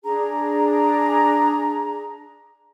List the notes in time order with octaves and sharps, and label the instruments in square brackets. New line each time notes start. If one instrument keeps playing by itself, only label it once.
[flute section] D4 G#4 A#5